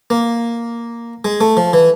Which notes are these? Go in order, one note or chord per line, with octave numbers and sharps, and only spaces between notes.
A#3
G#3
A3
F3
E3